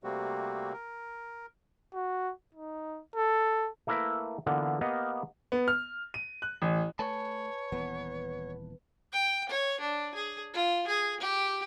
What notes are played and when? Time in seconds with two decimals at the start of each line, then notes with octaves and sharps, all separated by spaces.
0.04 C3 G3 A3 A#3 C4 F#4
0.73 A#4
1.94 F#4
2.55 D#4
3.16 A4
3.87 A3 A#3 E4 A#4 B4 E5
4.46 D3 E3 A#3 B3 F4
4.81 A#3 B3 G4 D#5 F5
5.52 B3
5.68 F6
6.14 D#7
6.42 F#6
6.62 A1
6.99 A3 B4 C#5 G#5 A5
7.72 D#1 E3 B3
9.12 G5
9.49 C#5
9.80 D4
10.15 G#4
10.53 F4
10.87 G#4
11.20 G4